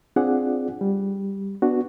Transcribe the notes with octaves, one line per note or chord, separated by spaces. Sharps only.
C4 D4 F4 G#4 D5 F#5
G3
B3 D4 F#4